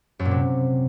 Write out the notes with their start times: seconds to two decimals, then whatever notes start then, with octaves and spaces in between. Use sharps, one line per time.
0.19 F#2
0.25 A#2
0.31 C3